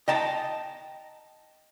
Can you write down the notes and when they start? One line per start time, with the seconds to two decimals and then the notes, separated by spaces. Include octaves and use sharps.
0.08 D#5 G5 A5 A#5